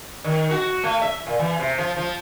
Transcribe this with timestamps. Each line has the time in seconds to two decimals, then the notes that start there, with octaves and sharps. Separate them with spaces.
0.24 D#3
0.51 F#4
0.83 A3
1.02 E5
1.27 A#2
1.39 E3
1.59 C3
1.78 F3
1.97 F3